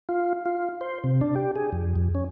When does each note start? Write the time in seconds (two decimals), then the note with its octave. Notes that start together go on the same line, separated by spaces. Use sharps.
0.09 F4
0.46 F4
0.81 C5
1.04 C3
1.21 D4
1.36 G4
1.56 G#4
1.72 F2
1.96 F2
2.15 C#4